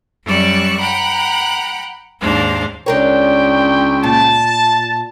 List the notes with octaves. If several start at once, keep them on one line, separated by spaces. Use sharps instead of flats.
F#2 G3 D5 C#6 E6 F#6
F#5 G5 A#5 B5 F#6
D#2 G#2 D4 C5 F5
C#2 D4 A#4 C#5 G5
A#2 A5